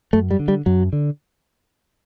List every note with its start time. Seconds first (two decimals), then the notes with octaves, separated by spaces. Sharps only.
0.13 F#2 A3
0.31 G3
0.39 D3
0.48 G3
0.66 F#2 F#3
0.93 D3